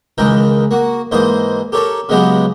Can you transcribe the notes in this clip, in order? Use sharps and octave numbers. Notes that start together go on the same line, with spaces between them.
C#2 D#3 E3 G#3 A#4 G5
A#3 F#4
G#2 E3 A#3 C5 D#5 D#6
G4 A4 A#4 C#5 A5
C#3 F#3 G#3 B3 G4 D#5